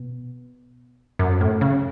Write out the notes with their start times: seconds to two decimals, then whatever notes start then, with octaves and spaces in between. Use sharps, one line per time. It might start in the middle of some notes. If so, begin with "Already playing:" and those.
Already playing: B2
1.19 F#2
1.41 A2
1.61 C#3